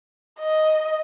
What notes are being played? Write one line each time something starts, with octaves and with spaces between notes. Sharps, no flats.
D#5